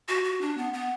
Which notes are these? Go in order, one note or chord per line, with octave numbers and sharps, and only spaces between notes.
F#4
F#4
D4
B3
B3